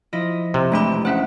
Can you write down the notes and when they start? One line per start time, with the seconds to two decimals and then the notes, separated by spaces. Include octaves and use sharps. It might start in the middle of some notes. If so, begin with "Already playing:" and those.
0.13 F3 E4 D#5
0.54 C3
0.72 E2 G#3 A3 D4 G5 B5
1.05 C#4 C5 E5 F#5